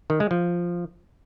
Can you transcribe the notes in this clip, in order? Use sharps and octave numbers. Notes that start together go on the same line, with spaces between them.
D#3
G#3
F3